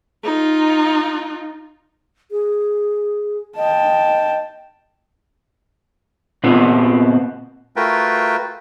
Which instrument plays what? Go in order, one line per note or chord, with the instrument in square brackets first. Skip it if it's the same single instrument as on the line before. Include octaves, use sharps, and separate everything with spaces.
[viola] D#4 F4
[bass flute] G#4
[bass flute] D#5 [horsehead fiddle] G5 A5
[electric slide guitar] A#2 B3 C4
[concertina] A3 F4 F#4 A#4 B4 G5